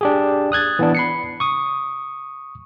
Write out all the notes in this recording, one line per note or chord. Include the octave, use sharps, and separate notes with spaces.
D4 G4 G#4
D#6 F#6 G#6 A6
E3 B3 D4
B5 C7 C#7
C#6 D#6